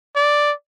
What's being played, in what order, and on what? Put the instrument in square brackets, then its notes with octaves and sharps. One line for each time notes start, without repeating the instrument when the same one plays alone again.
[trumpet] D5